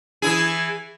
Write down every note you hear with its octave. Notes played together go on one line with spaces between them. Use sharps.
E3 E4 G#4